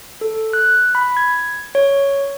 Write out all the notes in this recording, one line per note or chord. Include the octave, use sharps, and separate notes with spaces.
A4
F#6
B5
G#6
C#5